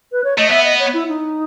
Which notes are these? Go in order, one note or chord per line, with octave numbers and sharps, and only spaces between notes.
B4
C#5
A3 D#5
B3 E5
D#5
C#5
E4
D#4